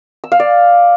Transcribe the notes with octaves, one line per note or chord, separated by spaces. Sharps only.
E6
F5
D5